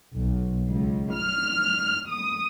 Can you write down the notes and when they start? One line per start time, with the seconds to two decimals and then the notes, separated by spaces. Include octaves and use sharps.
0.18 B1
0.69 C#2
1.12 F6
2.08 D#6